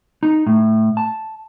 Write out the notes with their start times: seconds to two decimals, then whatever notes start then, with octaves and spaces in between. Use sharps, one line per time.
0.23 D#4
0.47 A2
0.97 A5